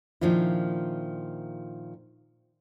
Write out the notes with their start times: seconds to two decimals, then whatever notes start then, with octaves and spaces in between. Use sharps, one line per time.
0.21 A#2 D#3 F3 D4 E4